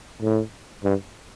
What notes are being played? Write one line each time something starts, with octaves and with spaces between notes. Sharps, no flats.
A2
G2